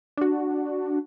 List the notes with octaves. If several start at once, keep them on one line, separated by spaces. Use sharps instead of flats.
D4 F#4